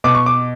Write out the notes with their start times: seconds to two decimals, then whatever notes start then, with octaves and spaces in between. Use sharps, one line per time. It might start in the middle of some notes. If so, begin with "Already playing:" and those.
0.04 B2 D6
0.15 C#6
0.26 D6